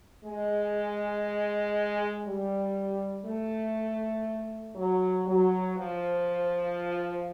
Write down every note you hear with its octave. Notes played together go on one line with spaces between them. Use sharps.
G#3
G3
A3
F#3
F#3
F3